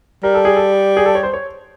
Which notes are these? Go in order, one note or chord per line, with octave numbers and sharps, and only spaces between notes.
G3 A#4
A4
G#4
A4
G#4
A4
C#5
C5
C#5